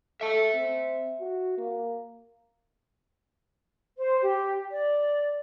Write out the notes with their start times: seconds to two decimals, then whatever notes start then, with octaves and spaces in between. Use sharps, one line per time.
0.21 A4 E5 A5
0.55 C4
1.21 F#4
1.58 A#3
3.98 C5
4.21 G4
4.70 D5